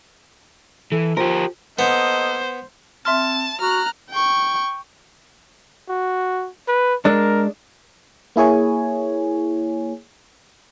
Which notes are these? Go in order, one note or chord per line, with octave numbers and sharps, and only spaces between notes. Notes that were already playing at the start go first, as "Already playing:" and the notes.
E3 A4
F3 G4 A#4
A#3 B3 A4 C5 D#5
C4 E5 A5 C6 F6
F#4 A#5 F6 F#6
G5 C#6
F#4
B4
G#3 D4 A#4
A#3 E4 G#4 C#5 G#5